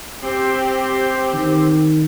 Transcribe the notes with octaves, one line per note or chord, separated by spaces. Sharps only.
C4 G4
D#3